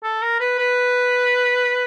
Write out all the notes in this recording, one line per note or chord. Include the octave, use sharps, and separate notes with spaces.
A4
A#4
B4
B4